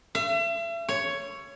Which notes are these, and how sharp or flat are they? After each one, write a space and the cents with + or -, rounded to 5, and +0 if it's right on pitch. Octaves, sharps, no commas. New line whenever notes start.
E5 +40
C#5 +5